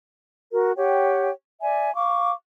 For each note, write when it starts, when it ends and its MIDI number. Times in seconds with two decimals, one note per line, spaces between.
0.52 0.71 66
0.52 0.71 70
0.77 1.29 67
0.77 1.29 73
0.77 1.29 78
0.77 1.29 79
1.61 1.93 74
1.61 1.93 76
1.61 1.93 80
1.95 2.31 77
1.95 2.31 85
1.95 2.31 86